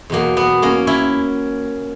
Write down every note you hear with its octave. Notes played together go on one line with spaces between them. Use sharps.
E2 B2 F#3 A#3
B3
A#3 C#4
C#4 E4